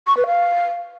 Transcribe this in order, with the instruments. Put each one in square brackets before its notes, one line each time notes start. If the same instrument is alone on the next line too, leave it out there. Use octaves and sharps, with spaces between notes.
[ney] C#6
B4
F5